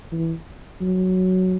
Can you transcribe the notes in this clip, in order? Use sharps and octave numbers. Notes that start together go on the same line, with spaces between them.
E3
F#3